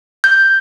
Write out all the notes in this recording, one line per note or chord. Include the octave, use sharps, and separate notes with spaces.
G6